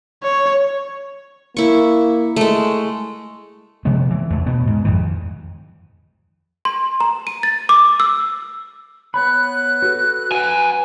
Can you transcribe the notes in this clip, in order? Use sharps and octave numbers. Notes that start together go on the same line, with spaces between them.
C#5
A#3 E4 C#6
G#3 A3
C3 F3 G#3 B3
E3
E2 A3
B2 B3
G#2
F2 D#3 E3
C6
A#5
D#7
A6
D6
E6
B3 C#5 B5 F#6
F#4 A4 B4
B4 F#5 G#5